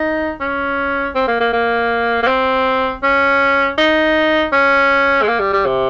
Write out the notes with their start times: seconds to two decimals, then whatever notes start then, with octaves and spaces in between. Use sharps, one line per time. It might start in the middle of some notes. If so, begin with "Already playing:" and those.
Already playing: D#4
0.41 C#4
1.15 C4
1.28 A#3
1.40 A#3
1.53 A#3
2.23 A#3
2.27 C4
3.03 C#4
3.78 D#4
4.52 C#4
5.22 G#3
5.28 A#3
5.40 G3
5.53 G3
5.66 C3